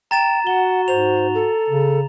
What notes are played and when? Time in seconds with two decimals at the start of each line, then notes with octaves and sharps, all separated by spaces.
0.11 G5 A#5 A6 E7
0.47 F#4 F#5 G7
0.88 G#2 C5 F7
1.35 A4
1.70 C#3